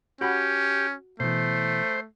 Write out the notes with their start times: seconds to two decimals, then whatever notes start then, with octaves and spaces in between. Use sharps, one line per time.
0.21 C#4 F#4 G4 F#5 B5
1.20 B2 E3 A3 C5